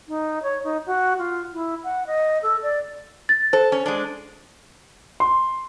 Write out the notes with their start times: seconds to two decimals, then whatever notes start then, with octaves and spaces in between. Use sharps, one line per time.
0.08 D#4
0.42 C#5
0.63 D#4
0.86 F#4
1.18 F4
1.53 E4
1.83 F#5
2.06 D#5
2.42 A4
2.62 D5
3.29 A6
3.53 A4 C5
3.72 C#4
3.86 G#3 D4
5.20 C6